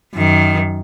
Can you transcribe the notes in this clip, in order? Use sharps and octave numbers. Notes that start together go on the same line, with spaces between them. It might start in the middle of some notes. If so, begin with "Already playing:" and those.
F#2 D#3